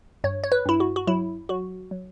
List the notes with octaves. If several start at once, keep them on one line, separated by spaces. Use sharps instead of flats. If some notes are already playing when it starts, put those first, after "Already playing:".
G2 C#5
C#5
B4
G2 E4
F#4
F#4
F#3 E4
F#3 F#4
F#3